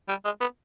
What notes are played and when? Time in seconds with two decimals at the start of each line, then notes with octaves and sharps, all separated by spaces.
0.09 G3
0.25 G#3
0.41 B3